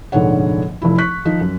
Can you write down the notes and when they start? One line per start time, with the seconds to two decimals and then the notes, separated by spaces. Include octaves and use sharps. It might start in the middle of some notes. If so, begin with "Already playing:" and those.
0.12 F1 A#1 G#2 D3 C#5 F#5
0.82 F1 F3 E4
0.98 C#6 F#6 B6
1.25 D#3 F3 D#4
1.41 F#2